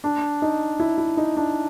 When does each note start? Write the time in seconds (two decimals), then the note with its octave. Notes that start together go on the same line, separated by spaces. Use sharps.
0.04 D4
0.42 D#4
0.80 E4
0.98 E4
1.17 D#4
1.37 D4